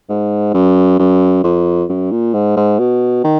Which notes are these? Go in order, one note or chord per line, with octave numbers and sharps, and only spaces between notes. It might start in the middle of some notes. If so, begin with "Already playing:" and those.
G#2
F#2
F#2
F2
F#2
A#2
G#2
G#2
B2
D#3